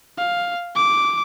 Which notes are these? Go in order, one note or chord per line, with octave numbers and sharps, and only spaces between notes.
F5
D6